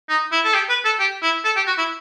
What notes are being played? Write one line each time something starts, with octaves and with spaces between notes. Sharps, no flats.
D#4
E4
A4
G4
B4
A4
G4
E4
A4
G4
F#4
E4